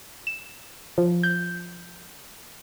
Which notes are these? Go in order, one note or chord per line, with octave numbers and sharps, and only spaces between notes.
E7
F3
G6